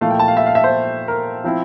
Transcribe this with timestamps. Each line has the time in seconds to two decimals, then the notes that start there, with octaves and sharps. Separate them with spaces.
0.01 A#2 F3 A3 E4 F5
0.10 G5
0.19 A5
0.28 F5
0.37 E5
0.46 F5
0.55 E5
0.64 C5
1.08 A#4
1.44 F3 C4 E4